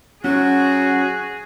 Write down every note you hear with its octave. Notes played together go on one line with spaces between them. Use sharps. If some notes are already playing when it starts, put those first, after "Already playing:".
F#3 C#4 F#4 G#4 C5